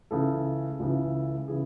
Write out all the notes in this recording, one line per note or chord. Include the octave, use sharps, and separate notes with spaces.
C#2 C#3 E3 A4
C#2 C#3 E3
C#3 E3 G#4